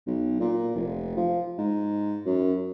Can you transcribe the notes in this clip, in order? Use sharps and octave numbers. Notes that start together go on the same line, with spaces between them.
B1
A#2
F1
F3
G#2
F#2